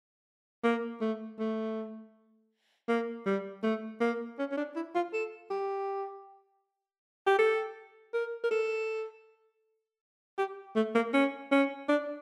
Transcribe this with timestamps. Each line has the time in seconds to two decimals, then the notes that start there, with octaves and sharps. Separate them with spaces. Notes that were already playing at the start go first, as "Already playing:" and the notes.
0.64 A#3
1.01 A3
1.39 A3
2.89 A#3
3.26 G3
3.63 A3
4.01 A#3
4.39 C#4
4.52 C#4
4.57 D4
4.76 E4
4.95 F4
5.13 A4
5.50 G4
7.27 G4
7.39 A4
8.13 A#4
8.44 A#4
8.51 A4
10.38 G4
10.76 A3
10.95 A#3
11.14 C#4
11.51 C#4
11.88 D4